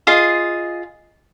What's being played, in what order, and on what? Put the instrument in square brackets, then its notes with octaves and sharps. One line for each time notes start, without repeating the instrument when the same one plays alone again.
[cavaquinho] F4 G#4 D#5